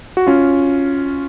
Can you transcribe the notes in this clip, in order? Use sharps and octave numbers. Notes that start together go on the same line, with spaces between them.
F#4
C#4 F4